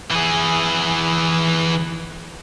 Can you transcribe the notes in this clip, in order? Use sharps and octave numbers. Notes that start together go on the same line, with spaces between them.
E3 G#4